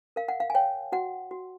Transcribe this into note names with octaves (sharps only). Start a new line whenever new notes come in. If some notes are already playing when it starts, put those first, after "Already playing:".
A#4 F5
F#5
F5
G#5
C#5 G5
F#4 F#5
F#4